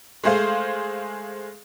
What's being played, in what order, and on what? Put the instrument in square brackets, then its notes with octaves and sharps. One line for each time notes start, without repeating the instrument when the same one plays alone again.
[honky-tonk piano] G#3 A3 G#4 C5 F5